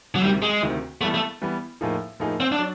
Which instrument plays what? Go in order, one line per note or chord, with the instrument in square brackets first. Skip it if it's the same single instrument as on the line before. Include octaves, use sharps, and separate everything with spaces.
[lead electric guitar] F#3
[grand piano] D2 C3 D#3 [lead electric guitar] G3
[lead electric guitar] G#3
[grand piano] D2 C3 D#3
[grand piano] E3 G3 B3 [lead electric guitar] A3
[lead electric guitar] A3
[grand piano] E3 G3 B3
A2 F3 A#3 D#4 G#4
A2 F3 A#3 D#4 G#4
[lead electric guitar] C4
D4
[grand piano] F#3